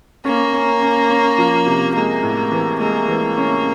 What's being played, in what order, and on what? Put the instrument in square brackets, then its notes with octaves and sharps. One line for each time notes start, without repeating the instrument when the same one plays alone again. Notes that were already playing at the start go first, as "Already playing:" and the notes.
[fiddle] A#3 [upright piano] C#4
[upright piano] C#4
C#4
C#4
F3
C3
[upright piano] G#3 [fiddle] A#3
[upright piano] A2
E3
[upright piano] G#3 [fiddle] A#3
[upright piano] E3
C#4